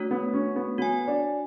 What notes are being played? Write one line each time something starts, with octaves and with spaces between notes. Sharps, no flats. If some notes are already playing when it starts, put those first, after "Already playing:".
Already playing: A3 D4 F#4 C#5
B3
C#4
B3
B3 F#4 C#5 G#5
D4